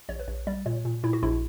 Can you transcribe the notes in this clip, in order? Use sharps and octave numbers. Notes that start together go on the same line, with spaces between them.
A#1 C#5
B4
A#1 C#5
G3 D5
A#2 C#5
A#2
A#2 E4
F#4
A#1 E4